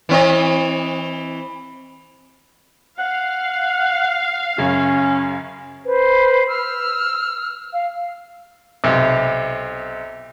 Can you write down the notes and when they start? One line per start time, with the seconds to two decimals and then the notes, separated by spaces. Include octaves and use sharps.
0.09 E3 C4 D#5
2.99 F5 F#5
4.58 F#2 C#3 C#4
5.85 B4 C5
6.48 E6 F6
7.73 F5
8.84 B1 C3